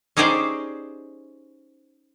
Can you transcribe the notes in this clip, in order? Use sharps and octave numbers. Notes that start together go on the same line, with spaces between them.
C#4 D#4 G4 G#4 C5 D5